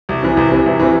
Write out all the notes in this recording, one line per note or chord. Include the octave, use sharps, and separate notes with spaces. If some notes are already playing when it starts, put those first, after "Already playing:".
C2
C3 E3
C2
C3 E3
C2
C3 E3